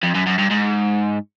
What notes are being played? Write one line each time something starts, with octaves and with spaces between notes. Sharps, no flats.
F2
F#2
F#2
G2
G#2